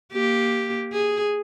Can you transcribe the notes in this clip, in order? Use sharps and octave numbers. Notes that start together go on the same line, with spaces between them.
A#3 G4
G#4